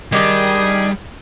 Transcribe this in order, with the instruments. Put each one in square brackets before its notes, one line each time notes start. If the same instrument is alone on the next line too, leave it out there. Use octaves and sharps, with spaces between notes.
[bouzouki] D#3 D4 D#4 [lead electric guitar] G3 [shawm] G#4